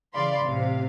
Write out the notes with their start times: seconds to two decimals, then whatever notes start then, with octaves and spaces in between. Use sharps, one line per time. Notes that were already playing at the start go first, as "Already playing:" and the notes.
0.15 C#3 E3 D5 F5 B5 C6
0.45 A1 C3 F5